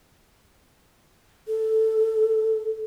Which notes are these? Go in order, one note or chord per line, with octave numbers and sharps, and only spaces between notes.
A4